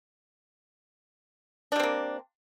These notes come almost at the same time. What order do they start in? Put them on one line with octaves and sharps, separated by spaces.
D4 G3 C4 A#3